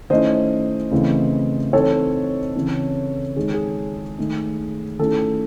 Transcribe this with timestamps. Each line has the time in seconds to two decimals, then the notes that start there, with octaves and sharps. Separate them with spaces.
0.10 D#3 A3 C#4 E4 C5 D#5
0.91 C#3 E3 A3 C4 E4
1.73 E3 C4 D#4 A4 C#5
2.55 C#3 E3 C4 E4
3.37 D#3 G#3 D#4 G#4
3.54 G#4
4.18 D#3 A3 D#4
4.99 D#3 A3 C#4 E4 A4